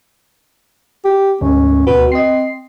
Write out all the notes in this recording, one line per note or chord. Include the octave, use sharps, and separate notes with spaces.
G4
D2 G#2 C#4
D2 B2 F#4 B4
C4 D#5 C7